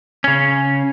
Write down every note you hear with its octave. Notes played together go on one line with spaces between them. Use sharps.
C#3 C#4